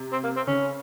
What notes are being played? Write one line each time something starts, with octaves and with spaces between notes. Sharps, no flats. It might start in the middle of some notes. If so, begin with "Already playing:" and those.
Already playing: C3
C4
A#3
C4
C#3 C#4